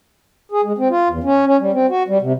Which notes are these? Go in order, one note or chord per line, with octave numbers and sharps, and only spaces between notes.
G#4
G#3
C4
F4
E2
C#4
C#4
G3
C4
F#4
G3
C3